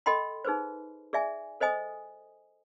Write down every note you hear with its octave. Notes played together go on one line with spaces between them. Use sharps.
A4 D#5 G5 B5 C6
D#4 G#4 B4 C5
G#4 D5 E5 G#5
A4 C5 D#5 G#5 D#6